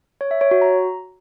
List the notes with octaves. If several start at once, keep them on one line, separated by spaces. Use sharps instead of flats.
C#5
E5
C#5
F#4
A#5